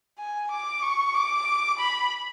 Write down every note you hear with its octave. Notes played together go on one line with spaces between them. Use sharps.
G#5
D6
C#6
D6
B5